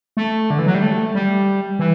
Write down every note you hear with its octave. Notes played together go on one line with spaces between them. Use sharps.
A3
D3
E3
F#3
G3
A3
G3
E3